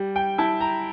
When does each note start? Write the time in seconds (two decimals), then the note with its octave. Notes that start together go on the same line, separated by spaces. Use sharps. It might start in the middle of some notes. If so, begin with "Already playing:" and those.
Already playing: G3
0.16 G5
0.38 E4 A5
0.60 A#5